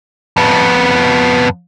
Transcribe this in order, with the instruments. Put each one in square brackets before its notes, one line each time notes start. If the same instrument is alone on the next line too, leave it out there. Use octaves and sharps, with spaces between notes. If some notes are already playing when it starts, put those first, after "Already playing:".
[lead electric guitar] F2 B3